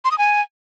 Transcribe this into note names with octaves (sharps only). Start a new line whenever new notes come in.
C6
D#6
G#5